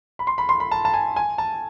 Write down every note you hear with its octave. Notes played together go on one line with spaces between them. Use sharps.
B5
C6
B5
C6
B5
A5
A5
G#5
G#5
A5